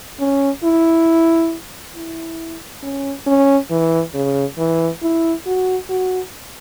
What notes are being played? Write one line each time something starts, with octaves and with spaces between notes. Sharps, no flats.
C#4
E4
E4
C#4
C#4
E3
C#3
E3
E4
F#4
F#4